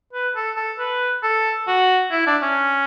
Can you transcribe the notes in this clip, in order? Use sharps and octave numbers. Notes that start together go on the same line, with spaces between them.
B4
A4
A4
B4
A4
F#4
E4
D4
C#4